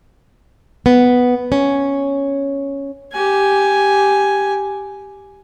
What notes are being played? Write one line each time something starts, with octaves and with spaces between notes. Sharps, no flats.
B3
C#4
G4 G#5